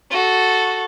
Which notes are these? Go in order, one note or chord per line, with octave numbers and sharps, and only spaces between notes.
F#4 A4